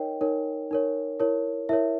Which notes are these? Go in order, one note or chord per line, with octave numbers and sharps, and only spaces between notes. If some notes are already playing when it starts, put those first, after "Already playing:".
Already playing: D#4 A#4 C#5 D#5 G5
D#4 A#4 C#5
D#4 A#4 C#5
E4 A#4 C#5
E4 A#4 C#5 E5